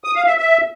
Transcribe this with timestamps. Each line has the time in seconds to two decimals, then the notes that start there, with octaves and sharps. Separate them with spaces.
0.04 D#6
0.15 F5
0.26 E5
0.37 E5